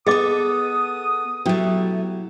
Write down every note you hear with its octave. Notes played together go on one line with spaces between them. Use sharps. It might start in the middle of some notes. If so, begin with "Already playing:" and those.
B3 G#4 A4 D#5 D6 D#6
B2 F#3 A3 E4 G4